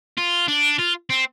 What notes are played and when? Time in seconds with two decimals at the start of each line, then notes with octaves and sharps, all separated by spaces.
0.17 F4
0.48 D4
0.79 F4
1.10 C4